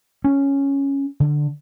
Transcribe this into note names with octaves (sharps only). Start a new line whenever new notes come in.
C#4
D3